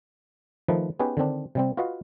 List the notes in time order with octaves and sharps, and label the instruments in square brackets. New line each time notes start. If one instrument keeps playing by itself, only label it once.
[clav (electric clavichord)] D#3 F3 A3 D#4 B4
B3 C#4 D#4 G4 G#4 B4
D3 D#3 C4 D4
C3 G3 C4
F4 F#4 B4 D#5 F5 F#5